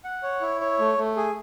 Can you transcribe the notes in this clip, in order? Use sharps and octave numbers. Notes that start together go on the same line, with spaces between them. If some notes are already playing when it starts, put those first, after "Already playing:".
F#5
C#5
E4
C#5
A3
A3
G#4